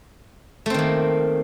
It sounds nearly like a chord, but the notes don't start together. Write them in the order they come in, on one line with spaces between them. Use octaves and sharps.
A3 C4 D#3 A#3